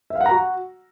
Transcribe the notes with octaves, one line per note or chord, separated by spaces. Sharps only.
E5
F5
F#5
A#5
F#4